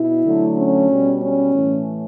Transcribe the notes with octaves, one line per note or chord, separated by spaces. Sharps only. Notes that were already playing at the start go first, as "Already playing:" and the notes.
Already playing: B2 E4
D3 F#3 A3
C#4
B2 G3
C#4
A2 E3 A3